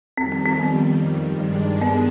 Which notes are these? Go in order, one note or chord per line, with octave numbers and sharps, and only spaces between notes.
F2 D#3 G3 C4
C4
C4
B3
G2 D#3 G#3 D4
B3